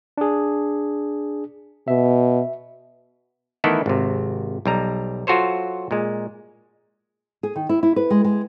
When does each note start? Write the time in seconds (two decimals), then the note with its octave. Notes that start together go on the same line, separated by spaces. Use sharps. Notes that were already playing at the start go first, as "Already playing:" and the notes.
0.18 D4 G#4
1.88 B2 E5
3.64 D#3 E3 A3 B3 E4 A4
3.86 G#1 C3
4.66 B1 G3 A#5
5.27 F#3 F4 F#4 A4 C5 C#5
5.91 A#2 G#3
7.43 G#4
7.56 D#3
7.69 E4
7.83 E4
7.96 B4
8.10 G#3
8.24 G#3